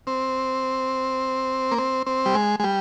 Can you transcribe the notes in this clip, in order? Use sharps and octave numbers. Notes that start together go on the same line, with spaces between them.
C4
A#3
C4
C4
G3
G#3
G#3
G3